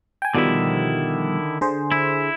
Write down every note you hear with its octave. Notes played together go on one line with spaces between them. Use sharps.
G5 G#5
B2 D3 D#3 F3 G3 E4
D3 G#4 C5
E4